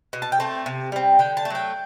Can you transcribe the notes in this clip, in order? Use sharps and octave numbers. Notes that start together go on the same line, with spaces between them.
B2
A5
G5
A3 C4 A5
C3
G3 C4
D3 G5
A5
A3
F#3 G5